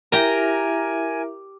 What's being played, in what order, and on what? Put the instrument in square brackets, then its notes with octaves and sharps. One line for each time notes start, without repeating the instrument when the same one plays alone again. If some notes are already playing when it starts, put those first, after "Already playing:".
[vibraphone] E4 E5 [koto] G4 A#5 [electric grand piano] A#4 [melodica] G#5